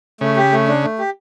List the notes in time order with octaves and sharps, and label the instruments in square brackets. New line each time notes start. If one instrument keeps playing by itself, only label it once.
[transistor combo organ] C#3 [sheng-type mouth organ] A3
[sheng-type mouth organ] G4
A3
D4
A3
G4